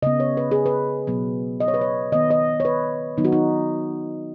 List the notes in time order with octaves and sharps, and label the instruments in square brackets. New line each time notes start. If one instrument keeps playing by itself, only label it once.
[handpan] C#3 B3 D#5
C#5
B4
G#4
B4
B2 F#3 B3
D#5
C#5
B4
C#5
D#3 B3 D#5
D#5
C#5
B4
D#3 F#3 B3 D#4
F#4
D#4